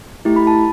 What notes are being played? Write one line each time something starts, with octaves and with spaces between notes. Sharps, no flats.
A3 E4 G4
B5
A5